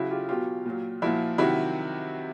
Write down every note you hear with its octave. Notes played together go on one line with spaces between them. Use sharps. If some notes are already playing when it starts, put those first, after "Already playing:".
Already playing: C#3 F#3 E4 F#4
F4 G4
B2 F#3 F4 G4
A#2 F#3
A#2 F3 E4 F#4
C3 D#3 F#3 E4 F#4